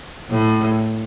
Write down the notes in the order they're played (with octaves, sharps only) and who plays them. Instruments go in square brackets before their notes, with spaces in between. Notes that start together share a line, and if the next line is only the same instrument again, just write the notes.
[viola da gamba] A2